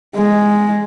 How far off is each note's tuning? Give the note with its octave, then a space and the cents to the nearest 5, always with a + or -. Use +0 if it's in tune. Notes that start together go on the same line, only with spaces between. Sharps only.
G#3 +0